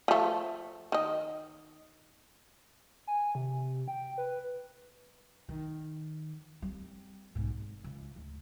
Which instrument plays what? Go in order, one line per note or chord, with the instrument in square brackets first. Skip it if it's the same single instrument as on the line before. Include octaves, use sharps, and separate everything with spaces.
[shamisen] F3 A3
D#3 D#5
[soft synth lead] G#5
C3
G5
B4
[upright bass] D#3
G3 C4
B1 G#2
G#1
C#2
D2